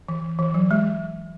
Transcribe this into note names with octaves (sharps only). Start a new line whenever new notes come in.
E3
E3
F#3
G#3